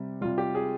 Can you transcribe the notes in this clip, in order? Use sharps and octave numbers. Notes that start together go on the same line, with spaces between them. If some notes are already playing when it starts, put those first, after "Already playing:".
Already playing: C3 G3
C3 G3 F4
G4
G#4